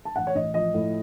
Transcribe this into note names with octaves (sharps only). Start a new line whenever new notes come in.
A5
A1 F#5
C#5
A1 D#5
F3 D#5
A2